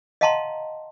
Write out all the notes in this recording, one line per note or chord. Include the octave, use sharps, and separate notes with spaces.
D#5 F5 F#5 A5 A#5 C6